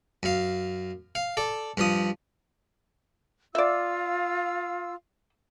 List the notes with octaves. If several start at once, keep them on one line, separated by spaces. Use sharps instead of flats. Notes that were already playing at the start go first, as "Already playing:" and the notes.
F#2 F5
F5
A4 D5
G2 F3 D#6
F4 D5 E5 F5 E6